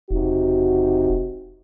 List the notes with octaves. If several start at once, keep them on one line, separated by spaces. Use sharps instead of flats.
E1 C3 D#4 F#4